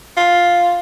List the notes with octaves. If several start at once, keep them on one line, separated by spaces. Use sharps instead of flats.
F4